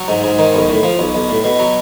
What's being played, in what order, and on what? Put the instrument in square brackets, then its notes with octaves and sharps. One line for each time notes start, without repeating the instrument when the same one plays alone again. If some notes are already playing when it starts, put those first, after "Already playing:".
Already playing: [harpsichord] F#3
G#2
G#2
D#3
B1
A2
F3
B1
B1
A2
B2
F#3